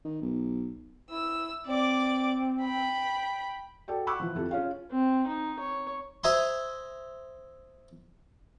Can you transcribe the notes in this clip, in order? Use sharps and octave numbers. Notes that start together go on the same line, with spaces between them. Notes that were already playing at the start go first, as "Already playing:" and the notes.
D#3
B1
E4 E6
C4 D5 D6
G5 B5
F#4 A4 D5 G5
F#5 B5 C#6 D6 E6 F#6
E3 F3
F2 C3 E4 A4
C#4 F4 G#4 F5
C4
D#4
C#5
C5 D#5 E5 G#5 A#5 C6